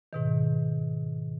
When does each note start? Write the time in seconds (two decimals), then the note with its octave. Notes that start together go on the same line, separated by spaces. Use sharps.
0.13 G#2 B2 D#3